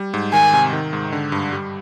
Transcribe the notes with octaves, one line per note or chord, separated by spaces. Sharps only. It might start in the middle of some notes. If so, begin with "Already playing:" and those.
Already playing: G3
G#2
D#3 G#5
C3
D#3
G#2
D3
G2
G3